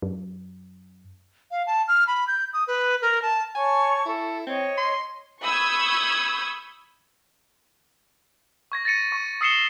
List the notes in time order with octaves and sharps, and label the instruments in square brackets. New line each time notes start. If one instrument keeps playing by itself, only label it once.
[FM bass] F#2
[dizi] F5
A5
F6
B5
G6
D#6
B4
A#4
A5
[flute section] C#5 A5 C#6 [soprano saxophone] G#5
[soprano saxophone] E4 [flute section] A4
[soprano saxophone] C4 [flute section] C#5 D#5
[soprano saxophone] C6
[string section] B5 C#6 D#6 E6 G6 G#6
[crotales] C#6 G#6 A#6
A6 A#6 C#7 D#7
C#6
D#6 E6 C7 C#7 E7 G7